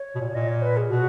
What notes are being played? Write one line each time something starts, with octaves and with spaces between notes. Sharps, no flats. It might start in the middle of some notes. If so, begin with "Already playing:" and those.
Already playing: C#5
B2
A#2
A#2 D#5
C#5
B4
G#4
B2 F#4